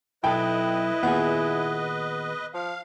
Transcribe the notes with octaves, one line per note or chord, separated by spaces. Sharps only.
B1 E4 A4 B4 D#5 G5
D#2 A#2 B3 G#4
F3 F5